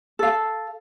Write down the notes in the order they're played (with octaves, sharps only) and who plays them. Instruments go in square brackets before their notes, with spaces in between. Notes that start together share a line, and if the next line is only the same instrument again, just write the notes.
[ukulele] A4 F5